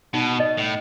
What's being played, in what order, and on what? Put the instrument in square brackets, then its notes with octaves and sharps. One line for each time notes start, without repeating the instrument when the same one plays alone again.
[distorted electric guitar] B2 [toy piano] D#4
[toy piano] D#5
[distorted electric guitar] A2